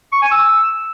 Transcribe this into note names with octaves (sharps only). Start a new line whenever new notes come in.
C#6
G#5
E6